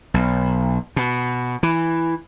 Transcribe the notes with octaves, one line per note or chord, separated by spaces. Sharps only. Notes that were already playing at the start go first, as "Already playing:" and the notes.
B1
B2
E3